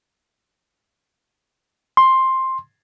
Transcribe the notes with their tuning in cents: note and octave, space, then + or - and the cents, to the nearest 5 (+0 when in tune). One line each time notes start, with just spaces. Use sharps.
C6 +10